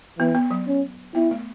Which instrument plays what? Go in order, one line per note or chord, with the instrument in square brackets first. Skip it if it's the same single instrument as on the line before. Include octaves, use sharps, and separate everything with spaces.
[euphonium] E3 [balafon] B3
[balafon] B3
F#3
[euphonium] C#4
[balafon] B3 [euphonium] E4
[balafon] A3